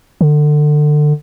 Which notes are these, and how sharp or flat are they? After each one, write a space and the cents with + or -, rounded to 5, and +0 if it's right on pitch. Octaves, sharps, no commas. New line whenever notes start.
D3 +25